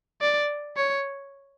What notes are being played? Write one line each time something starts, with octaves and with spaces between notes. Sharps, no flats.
D5
C#5